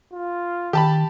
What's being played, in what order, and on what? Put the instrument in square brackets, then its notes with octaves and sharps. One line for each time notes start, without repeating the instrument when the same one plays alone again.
[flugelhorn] F4
[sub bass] D#3 [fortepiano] G4 A5 B5